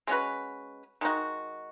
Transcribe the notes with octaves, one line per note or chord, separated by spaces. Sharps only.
G#3 C#4 F#4 B4
D#3 G#3 D#4 F#4